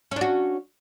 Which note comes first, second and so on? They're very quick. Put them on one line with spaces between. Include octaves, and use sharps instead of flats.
C#4 D4 F#4